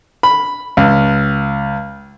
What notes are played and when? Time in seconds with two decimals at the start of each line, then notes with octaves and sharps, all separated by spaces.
0.23 B5
0.77 C#2